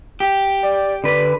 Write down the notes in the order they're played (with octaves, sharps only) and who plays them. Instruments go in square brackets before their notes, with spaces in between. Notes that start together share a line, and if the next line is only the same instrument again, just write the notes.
[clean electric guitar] G4
[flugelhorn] D5
[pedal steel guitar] D3 B4 [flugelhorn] D5